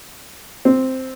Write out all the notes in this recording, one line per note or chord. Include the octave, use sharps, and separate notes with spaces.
C4